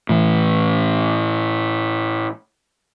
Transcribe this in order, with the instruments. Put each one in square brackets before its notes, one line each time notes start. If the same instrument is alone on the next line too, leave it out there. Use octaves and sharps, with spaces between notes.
[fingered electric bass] A2 E3